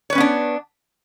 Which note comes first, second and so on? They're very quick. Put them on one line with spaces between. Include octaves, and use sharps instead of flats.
C#5 B4 C#4 B3 D4